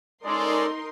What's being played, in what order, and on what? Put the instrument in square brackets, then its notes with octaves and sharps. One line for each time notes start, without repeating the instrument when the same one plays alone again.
[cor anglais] G#3 [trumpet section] C#4 A4 D5 [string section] D#4 A#4 C6